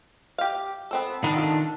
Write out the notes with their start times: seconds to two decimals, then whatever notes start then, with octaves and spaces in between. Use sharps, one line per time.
0.38 G4 F5
0.91 B3 C4 A4
1.24 D#3 B3 D4
1.36 F4 A4